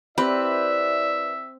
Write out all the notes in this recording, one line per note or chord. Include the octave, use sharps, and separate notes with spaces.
C4 E4 G4 B4 D5 E5